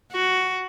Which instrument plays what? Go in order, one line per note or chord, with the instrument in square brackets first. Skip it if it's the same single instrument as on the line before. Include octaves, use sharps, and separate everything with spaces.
[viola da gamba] F#4